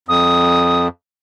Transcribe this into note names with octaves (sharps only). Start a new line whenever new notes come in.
F2 D#6